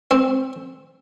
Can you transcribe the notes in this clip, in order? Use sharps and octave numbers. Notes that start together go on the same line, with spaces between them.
C4